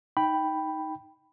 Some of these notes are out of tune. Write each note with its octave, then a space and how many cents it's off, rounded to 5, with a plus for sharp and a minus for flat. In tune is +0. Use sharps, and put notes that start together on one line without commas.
D#4 +10 G5 +0 B5 +0